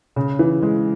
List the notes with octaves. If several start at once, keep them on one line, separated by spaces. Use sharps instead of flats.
C#3
E3
G#3